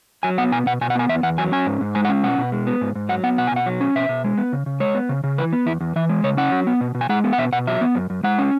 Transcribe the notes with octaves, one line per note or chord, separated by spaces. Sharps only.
F#3 G#5
B3 F#5
B2 G#5
B2 F#5
B2 G#5
F#5
B3 G#5
E2 E5
E2 F#5
F#3 G#5
C#4 G#5
G#2
G#2
G#3 G#5
F#5
C#4
B2 F#5
B2
G#3
B3
G#2
G#2
F#3 F#5
B3 F#5
B2 F#5
G#5
B2 F#5
F#3
C#4
B2 E5
B2
G#3
B3
C#3
C#3
G#3 C#5
B3
C#3
C#3
E3 B4
B3
E2 E4
E2
E3 E5
G#3
C#3 C#5
C#4 F#5
F#3
B3
B2
B2
G#5
G#3 F#5
B3
F#5
B2 E5
B2 F#5
F#3 E5
B3
F#2
F#2
G#3 F#5
C#4